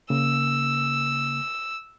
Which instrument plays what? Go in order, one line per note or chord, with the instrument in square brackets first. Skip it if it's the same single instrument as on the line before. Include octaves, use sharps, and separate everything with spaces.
[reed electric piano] C#3 A#3 [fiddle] E6